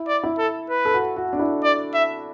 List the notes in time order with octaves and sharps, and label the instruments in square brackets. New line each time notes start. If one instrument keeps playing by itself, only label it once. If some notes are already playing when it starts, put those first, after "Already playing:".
Already playing: [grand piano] E4
[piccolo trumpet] D5
[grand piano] E4
[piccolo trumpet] A4
B4
[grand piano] A4
F#4
F#4
D4
E4
[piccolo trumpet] D5
E5